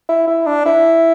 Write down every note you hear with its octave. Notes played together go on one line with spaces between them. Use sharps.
E4
E4
D4
E4